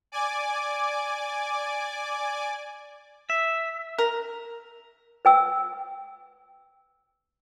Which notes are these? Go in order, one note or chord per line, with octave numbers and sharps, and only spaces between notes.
D5 G#5 D6
E5
A#4
B4 G5 E6